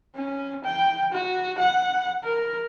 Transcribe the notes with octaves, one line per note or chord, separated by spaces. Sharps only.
C#4
G5
F#4
F#5
A#4